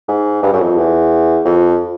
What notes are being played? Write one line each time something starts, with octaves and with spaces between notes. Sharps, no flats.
G#2
G2
F#2
F2
E2
F2